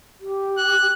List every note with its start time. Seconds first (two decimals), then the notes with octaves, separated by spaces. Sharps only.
0.20 G4
0.58 F#6